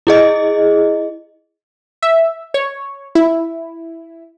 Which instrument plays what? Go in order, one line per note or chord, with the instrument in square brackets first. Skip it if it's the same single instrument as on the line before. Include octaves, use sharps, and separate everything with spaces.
[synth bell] E4 G#4 D#5
[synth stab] E5
C#5
E4